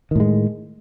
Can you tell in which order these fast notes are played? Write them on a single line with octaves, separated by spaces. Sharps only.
D#3 A2 G#3